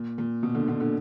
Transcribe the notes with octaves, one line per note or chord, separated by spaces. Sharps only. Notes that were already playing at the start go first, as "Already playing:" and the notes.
Already playing: A#2
A#2
B2
A#2 D3
A#2 D3
A#2 D3